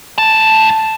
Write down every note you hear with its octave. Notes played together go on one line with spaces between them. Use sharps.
G#2 A5